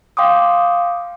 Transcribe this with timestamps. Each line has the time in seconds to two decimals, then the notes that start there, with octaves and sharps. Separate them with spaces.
0.17 F5 G5 C6 D6 D#6